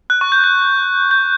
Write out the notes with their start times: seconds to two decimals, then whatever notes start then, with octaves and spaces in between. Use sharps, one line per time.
0.10 F#6
0.21 C#6
0.32 G6
0.44 G6
1.11 G6